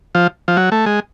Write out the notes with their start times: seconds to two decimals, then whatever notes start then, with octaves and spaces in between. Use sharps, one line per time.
0.15 F3
0.48 F3
0.57 F#3
0.72 A3
0.86 G#3